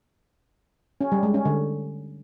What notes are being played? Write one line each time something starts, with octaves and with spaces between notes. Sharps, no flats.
C#4
G3
G#3
C#4
D3